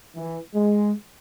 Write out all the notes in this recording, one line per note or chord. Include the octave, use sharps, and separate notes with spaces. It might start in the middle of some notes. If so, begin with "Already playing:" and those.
E3
G#3